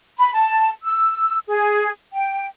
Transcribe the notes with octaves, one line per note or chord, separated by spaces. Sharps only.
B5
A5
E6
G#4
G5